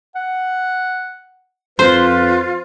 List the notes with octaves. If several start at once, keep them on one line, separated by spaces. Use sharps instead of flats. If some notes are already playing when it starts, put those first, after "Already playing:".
F#5
F2 F4 B4 C5